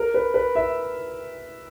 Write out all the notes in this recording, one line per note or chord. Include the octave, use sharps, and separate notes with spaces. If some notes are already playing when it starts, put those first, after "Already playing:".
Already playing: A#4
B4
B4
E5